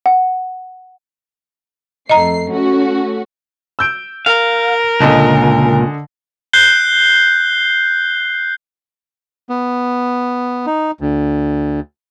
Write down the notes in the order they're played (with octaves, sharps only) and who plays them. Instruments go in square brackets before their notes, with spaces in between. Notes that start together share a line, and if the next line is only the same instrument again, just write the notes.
[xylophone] F#5
[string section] F2 A3 C7 [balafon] D#5 A#5
[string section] A3 C#4 F#4
[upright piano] E6 G6 D7
[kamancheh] A#4 [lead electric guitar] F5
[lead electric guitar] C#2 A#2 [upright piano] D3 D#5 A5
[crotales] F#6 G6 C7 G7
[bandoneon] B3
D#4
D2